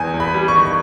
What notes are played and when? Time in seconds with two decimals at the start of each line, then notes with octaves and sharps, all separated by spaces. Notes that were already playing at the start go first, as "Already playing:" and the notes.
Already playing: E2 G#5
0.14 E2
0.20 B5
0.34 G3
0.48 C#6
0.55 D#3
0.65 C#6